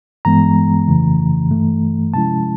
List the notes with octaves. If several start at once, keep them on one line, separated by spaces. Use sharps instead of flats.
G2 E3 G#3 B3 A#5
F2 C#3 E3 A3
G2 E3 A3
C3 F3 G#3 C#4 E4 A5